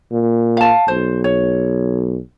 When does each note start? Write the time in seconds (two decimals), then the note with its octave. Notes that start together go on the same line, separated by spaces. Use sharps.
0.12 A#2
0.57 F5 A5
0.88 B1 C5
1.24 C#5